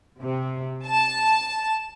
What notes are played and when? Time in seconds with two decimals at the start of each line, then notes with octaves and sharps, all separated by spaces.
0.21 C3
0.86 A5